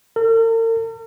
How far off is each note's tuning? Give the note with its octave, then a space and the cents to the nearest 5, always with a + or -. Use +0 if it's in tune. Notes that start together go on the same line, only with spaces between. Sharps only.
A#4 -45